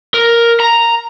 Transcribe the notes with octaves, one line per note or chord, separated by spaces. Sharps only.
A#4
A#5